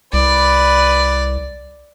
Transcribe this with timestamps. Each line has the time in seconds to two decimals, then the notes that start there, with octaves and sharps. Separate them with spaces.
0.13 C2 B4 D5